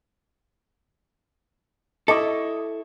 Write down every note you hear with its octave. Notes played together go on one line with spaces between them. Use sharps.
E4 A4 D#5 C#6 D6